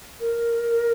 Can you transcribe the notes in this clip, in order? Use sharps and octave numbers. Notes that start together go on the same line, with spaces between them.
A#4